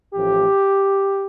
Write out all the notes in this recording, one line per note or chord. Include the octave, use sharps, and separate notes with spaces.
A1 A2 F3 G4